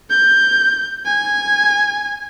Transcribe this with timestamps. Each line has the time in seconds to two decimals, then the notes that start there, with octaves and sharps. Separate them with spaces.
0.10 G6
1.06 G#5